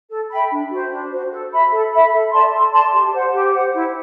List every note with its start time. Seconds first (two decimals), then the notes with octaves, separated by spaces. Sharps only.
0.10 A4
0.30 E5 G5 B5
0.50 D4
0.70 F#4 C5
0.91 D4
1.12 F#4 C5
1.32 A4
1.52 E5 B5
1.71 A4
1.92 E5 B5
2.12 A4
2.32 D5 A5 C6
2.52 A4
2.73 D5 A5 C6
2.93 G4
3.13 C5 F#5
3.33 G4
3.53 C5 F#5
3.74 E4